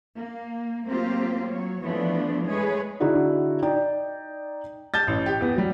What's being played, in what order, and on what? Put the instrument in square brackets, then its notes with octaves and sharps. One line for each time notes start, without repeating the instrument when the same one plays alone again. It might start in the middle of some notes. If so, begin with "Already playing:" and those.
[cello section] A#3
F#3 A3 A#3 C4 F4 G4
F#3 C#5
E3 F3 A3 B3 D4
G#3 A3 G#4 B4 C#5
[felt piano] D3 D#4 E4 F#4 G#4 D5
D#4 D5 G5
[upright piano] A5 G6 A6
A1
G4
E2 B3
F#3 G3